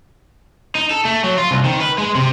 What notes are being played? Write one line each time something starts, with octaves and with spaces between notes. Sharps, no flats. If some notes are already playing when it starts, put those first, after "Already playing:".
D#4
A4
A3
F#3
F4
C2
D#3
B4
G#3
C3